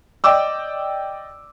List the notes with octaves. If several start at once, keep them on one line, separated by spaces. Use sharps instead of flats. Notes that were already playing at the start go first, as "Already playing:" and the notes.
D5 D#5 G5 D6 E6